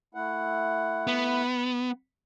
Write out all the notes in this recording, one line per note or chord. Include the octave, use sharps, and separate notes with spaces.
A3 E4 F#5
B3